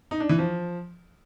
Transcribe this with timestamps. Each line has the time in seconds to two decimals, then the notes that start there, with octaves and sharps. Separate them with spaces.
0.11 D#4
0.20 D4
0.29 E3
0.38 F3